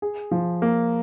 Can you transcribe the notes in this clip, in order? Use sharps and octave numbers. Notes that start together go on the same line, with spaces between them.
G#4
F3
A#3